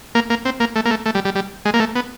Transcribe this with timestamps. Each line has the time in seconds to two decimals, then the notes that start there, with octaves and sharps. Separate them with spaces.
0.15 A#3
0.30 A#3
0.45 C4
0.60 A#3
0.76 A3
0.85 A#3
0.90 A3
1.06 A3
1.15 G3
1.25 G3
1.35 G3
1.65 G#3
1.74 A#3
1.80 A3
1.95 B3